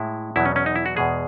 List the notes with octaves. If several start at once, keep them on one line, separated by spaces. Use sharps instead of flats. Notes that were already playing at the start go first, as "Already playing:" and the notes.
Already playing: A2 G#3 E4
E2 B2 F#3 E4
C#4
C#4
D#4
E4
F#4
E2 B2 G#3 G#4